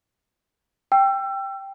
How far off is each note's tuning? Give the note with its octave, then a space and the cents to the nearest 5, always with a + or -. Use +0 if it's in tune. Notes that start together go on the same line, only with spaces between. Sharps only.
G5 +0 E6 +30